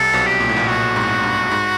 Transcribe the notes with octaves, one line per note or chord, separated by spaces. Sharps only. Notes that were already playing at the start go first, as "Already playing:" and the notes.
Already playing: C2 C3 A4
B1 B2
G4
A#2
A2
A#1 A#2
A#1 A#2 F#4
G#2
G2
G#2